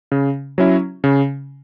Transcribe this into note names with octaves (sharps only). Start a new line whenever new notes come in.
C#3
F#3 C#4 E4
C#3